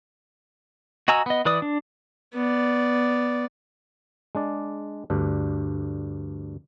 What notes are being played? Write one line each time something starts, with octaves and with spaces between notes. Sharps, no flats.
F#4 D#5 G#5 A#5 E6
B3 D#5
E3 B4 D5 D#6
D4
B3 D5
G#3 D4 D5
D2 G2 D4